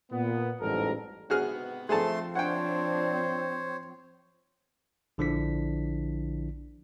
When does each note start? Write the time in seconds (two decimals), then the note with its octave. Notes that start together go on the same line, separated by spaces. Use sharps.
0.12 A#2 B3
0.61 A1 F2 G#2 G3 A4 A#4
1.30 G#2 C3 B3 F#4 G#4 F6
1.89 F3 A3 C4 G#4 A4 A5 C6
2.35 D4 C5 C#5 F#5 G5
5.18 A#1 D3 F3 D4 E4 B6